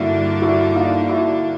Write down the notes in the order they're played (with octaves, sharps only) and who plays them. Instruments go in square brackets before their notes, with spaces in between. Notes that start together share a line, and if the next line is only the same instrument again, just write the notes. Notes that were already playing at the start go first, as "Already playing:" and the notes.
Already playing: [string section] G2 D3 G3 A#3 D4 [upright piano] E4 F#4
[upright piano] E4 F#4
D#4 F4
E4 F#4